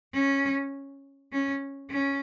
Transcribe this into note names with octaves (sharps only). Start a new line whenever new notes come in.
C#4
C#4
C#4